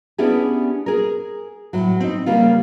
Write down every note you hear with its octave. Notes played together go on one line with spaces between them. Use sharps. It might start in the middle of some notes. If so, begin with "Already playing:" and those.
B3 C#4 D4 E4 G4 G#4
G#4 A#4
A2 F#3
C4 D#4
C#3 G3 A#3 F4